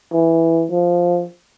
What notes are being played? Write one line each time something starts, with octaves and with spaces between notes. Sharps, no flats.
E3
F3